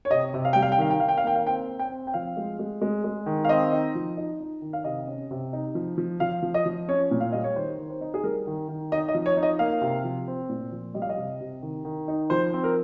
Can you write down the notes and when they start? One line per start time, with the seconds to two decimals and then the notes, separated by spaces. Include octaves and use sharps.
0.05 C#5
0.10 C3 D#5
0.34 C3
0.45 F5
0.53 G3 G5
0.62 F5
0.72 G5
0.78 D#3 F5
0.91 G5
1.00 D#3 F5
1.09 G5
1.17 F5
1.24 A#3 G5
1.35 F5
1.47 C4 G5
1.69 C4
1.79 G5
1.92 C4
2.07 G5
2.14 F3 F5
2.37 G#3
2.59 G#3
2.81 G#3
3.04 G#3
3.26 D#3
3.45 F5
3.49 C4 D#5
3.72 D#4
3.95 F3
4.17 D#4
4.40 D#4
4.62 D#3
4.73 F5
4.84 C3 D#5
5.07 C#4
5.31 C3
5.53 D#4
5.75 F3
5.98 F3
6.20 F3 F5
6.42 F3
6.54 D#5
6.66 F3
6.88 C#4 C#5
7.11 A#2
7.20 F5
7.32 G3 D#5
7.44 C#5
7.56 D#3 C5
7.78 D#3
7.90 C5
8.01 D#4
8.14 G#4
8.23 G3 A#4
8.47 D#3
8.68 D#3
8.92 D#4 D#5
9.08 D#5
9.14 F3
9.26 C#5
9.37 D#4
9.43 D#5
9.59 A#3 F5
9.82 C3
10.04 F3
10.28 C4
10.49 A#2
10.72 F3
10.94 G3 D#5
11.02 F5
11.09 D#5
11.17 C3
11.41 C3
11.62 D#3
11.85 D#3
12.08 D#4
12.30 F3 C5
12.54 C4
12.64 A#4